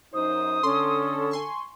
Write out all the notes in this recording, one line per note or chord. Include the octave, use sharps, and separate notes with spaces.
F#2 D#4 C5 D#6
D3 C#4 A4 C6
G#5 C6 C#6